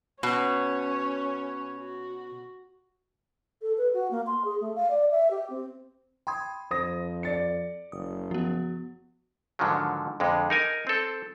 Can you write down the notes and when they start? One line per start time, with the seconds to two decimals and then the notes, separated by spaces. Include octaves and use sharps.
0.23 B2 C#4 C#5
1.77 F#4
3.62 A4
3.78 B4
3.94 F#4
4.11 A#3
4.27 C6
4.45 G#4
4.61 A3
4.76 F5
4.90 D5
5.11 E5
5.31 G4
5.50 C4
6.27 G5 B5 C6 D#6 G#6
6.71 F2 C5 D#6 A#6
7.23 D5 A6 C#7
7.92 F#1 D#6
8.31 F3 B3 F#4
9.59 G#2 D3 D#3 F3 F#3
10.20 F2 D3 G#3
10.50 D#4 A#4 G#5
10.87 C4 A4